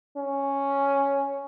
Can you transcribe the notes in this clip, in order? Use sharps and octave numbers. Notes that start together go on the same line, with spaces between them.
C#4